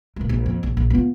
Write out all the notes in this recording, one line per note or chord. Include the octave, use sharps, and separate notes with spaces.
A#2 A3
A#1
F2
A#1
A#1
B3 F4